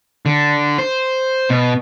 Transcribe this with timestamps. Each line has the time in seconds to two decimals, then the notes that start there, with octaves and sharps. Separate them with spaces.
0.26 D3
0.78 C5
1.50 B2